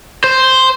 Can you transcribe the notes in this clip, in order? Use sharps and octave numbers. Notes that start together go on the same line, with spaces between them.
C5